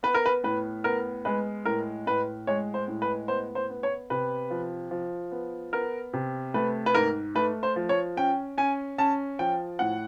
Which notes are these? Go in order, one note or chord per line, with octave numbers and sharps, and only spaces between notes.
B3 B4
A#4
B4
A2 B4
B3 A#4
G#3 B4
A2 A#4
A2 B4
G#3 C#5
C5
A2
B4
B3 C5
C5
B3
C#5
C3 B4
F3
F3
B3
B3 A#4
C3
A3 B4
B4
G#2 A#4
A3 B4
C5
F3
C#5
C#4 G5
C#4 G#5
C#4 A5
F3 G5
A2 F#5